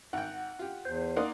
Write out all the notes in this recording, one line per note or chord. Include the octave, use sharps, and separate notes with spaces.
G#1 F#5 G5
F4 G4
E2 C5
A#3 D#4 D5 F#5 C6 D#6